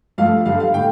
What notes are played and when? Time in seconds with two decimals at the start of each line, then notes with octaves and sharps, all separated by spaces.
0.18 G2 F3 A3 F5
0.45 G2 D3 G3 F5
0.60 F5
0.74 A2 G5